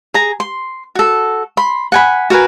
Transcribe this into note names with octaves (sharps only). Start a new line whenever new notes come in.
G#4 A#5
C6
F#4 A4
B5 C6
F#5 G#5 B5
F#4 A#4 B4 G#5